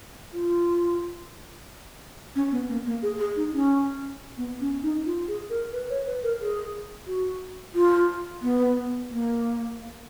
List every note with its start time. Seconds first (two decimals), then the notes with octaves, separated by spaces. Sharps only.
0.33 F4
2.35 C#4
2.52 B3
2.69 A#3
2.86 A#3
3.03 G#4
3.19 G#4
3.36 D#4
3.53 C#4
4.37 B3
4.60 C#4
4.83 D#4
5.06 F4
5.28 G#4
5.50 A#4
5.72 B4
5.90 C#5
6.06 B4
6.23 A#4
6.40 G#4
7.07 F#4
7.75 F4
8.42 B3
9.10 A#3